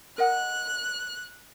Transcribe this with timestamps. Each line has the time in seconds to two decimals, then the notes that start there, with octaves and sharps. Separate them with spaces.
0.18 A#4 D#5 F#5 F#6